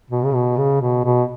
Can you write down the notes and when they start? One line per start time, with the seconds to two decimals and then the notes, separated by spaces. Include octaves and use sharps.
0.10 B2
0.24 C#3
0.34 B2
0.57 C#3
0.81 B2
1.05 B2